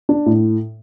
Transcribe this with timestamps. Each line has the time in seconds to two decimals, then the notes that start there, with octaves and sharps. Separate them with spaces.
0.09 D4
0.26 A2